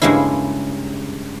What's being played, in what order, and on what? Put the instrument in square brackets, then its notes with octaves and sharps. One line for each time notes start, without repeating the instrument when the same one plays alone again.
[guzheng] G2 C#3 G#3 A#3 E4